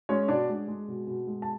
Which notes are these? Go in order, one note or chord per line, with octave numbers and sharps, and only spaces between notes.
G#3 C#4 C#5
B2 D4 D5
G#3
G#3
B2
B2
G#3
A5